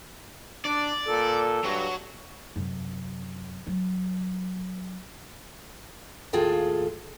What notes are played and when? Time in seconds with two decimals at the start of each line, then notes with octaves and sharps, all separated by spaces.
0.65 D4 D5
1.08 A#2 A4
1.64 G2 F#3 F#4
2.56 F#2 C3
3.67 F#3
6.33 D#2 A2 F4 G#4 A4 G5